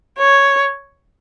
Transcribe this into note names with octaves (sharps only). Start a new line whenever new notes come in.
C#5